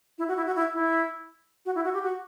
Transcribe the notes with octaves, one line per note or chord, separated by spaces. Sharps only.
E4
F#4
E4
F#4
E4
E4
F#4
E4
F#4
G4
F#4